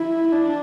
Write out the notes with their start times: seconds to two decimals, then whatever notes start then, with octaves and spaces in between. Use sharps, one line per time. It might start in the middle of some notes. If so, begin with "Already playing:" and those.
Already playing: E4
0.33 D4